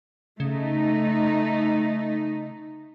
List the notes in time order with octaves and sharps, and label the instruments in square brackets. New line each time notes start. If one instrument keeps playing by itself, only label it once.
[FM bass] C#3 [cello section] A3 D#4